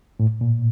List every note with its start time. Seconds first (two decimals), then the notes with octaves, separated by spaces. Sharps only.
0.20 A2
0.41 A#2